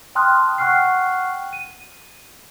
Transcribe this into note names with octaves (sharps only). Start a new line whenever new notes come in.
G5 A5 C6 D#6 F6 F#6
F#5 G5 C#6 F6 F#6 C7
D#7